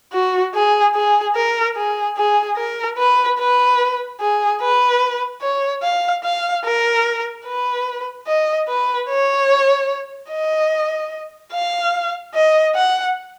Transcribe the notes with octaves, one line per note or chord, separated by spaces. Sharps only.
F#4
G#4
G#4
A#4
G#4
G#4
A#4
B4
B4
G#4
B4
C#5
F5
F5
A#4
B4
D#5
B4
C#5
D#5
F5
D#5
F#5